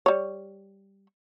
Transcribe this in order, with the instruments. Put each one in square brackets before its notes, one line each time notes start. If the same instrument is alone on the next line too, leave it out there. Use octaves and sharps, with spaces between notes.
[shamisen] G3 C#5